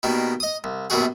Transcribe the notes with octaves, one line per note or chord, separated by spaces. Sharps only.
B2 D#3 G3 A#3
D#5 D#6
C2
A#1 F#2 B2 G3 F#4 G#4